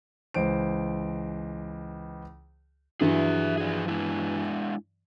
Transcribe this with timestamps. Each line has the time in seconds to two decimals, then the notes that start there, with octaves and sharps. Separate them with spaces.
0.34 C#2 E3 C5 D7
3.01 G2 E3 F#3 G#4 E5
3.58 F3 G#4
3.88 G#3 D4 E4